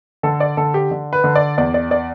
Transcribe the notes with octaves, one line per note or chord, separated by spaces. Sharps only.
D3 A4
D5
D3 A4
G4
D3
B4
D3
D5
E2 D5
D5
D5